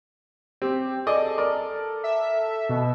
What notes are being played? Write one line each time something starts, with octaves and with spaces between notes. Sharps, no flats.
C4 G4
G#4 A4 D5 D#5
A#4 D5
E5
B2